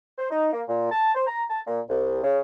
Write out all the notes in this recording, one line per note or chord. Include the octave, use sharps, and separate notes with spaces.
C5
D#4
A#3
A#2
A5
C5
A#5
A5
A#2
C2
C#3